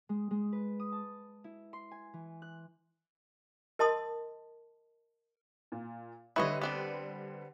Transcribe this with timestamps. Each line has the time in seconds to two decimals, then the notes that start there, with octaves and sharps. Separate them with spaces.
0.09 G#3
0.31 G#3
0.52 B4
0.80 D#6
0.92 A5
1.44 E4
1.73 C6
1.91 G#5
2.14 E3
2.42 F#6
3.79 A#4 D#5 A5 C6 D#6
5.72 A#2
6.36 D3 G3 E4 B4 C#5 D#5
6.61 B3 C4 D4